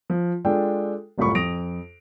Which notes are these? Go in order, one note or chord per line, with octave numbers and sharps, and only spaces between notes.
F3
G#3 D4 F4 A4 G5
F#1 C2 A2 F4 B5 C#6
F2 D#6 A#6 D7 F7